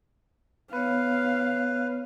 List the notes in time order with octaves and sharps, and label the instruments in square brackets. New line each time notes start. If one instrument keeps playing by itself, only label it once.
[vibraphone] B3 C#5 [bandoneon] B4 [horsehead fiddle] F5